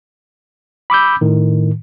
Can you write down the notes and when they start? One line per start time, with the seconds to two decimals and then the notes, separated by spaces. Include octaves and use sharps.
0.90 B5 D6 E6 G6
1.21 A2 D#3